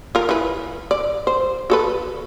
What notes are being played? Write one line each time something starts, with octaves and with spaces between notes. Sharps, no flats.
F4 A#4
E3 B4
D5
C5
F#4 A4 B4